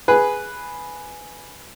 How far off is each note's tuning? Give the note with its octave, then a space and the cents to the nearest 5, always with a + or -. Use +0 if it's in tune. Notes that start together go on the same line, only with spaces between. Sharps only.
G#4 +0 B4 +0